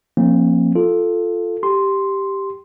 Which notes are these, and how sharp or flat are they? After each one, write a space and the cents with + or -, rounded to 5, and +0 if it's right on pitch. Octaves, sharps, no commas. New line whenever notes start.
F3 +0 A#3 +0 C#4 -45
F4 +0 A4 +0
G4 +0 C6 +0